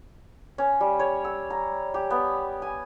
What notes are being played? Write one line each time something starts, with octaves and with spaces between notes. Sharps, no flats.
C#4
G3
C#5
E6
A#5
G4
B3
G#5